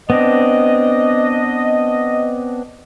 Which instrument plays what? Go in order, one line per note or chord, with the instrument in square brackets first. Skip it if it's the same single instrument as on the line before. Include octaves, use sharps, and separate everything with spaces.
[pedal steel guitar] B3 C4 D4 [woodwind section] D#5